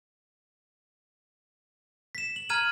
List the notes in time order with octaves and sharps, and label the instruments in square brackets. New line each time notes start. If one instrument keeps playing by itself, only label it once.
[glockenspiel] B6 E7
F#7
A#5 F6 G#6 D#7 F#7